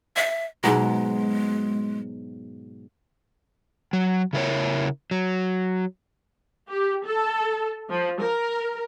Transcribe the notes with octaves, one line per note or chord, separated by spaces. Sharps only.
E5
G#2 B2 F#3 G#3
F#3
C#3 E4 A#4 C#5
F#3
G4
A4
F3
A#4